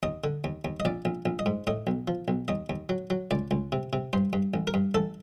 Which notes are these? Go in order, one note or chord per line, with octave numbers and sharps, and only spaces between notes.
D#2 D#5
D3
D#2
D#2
D#5
A#1 D5
A#1
A#1
D#5
G#2
A2 D#5
B1
F3
B1
D#2 D#5
D#2
F#3
F#3
C#2 D5
C#2
C3
C3
G2 C5
G2
A1
A#4
G2
A1 A4